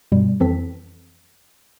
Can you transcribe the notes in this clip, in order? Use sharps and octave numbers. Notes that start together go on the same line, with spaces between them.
G2 B2 G3
F2 E3 C4 A4 B6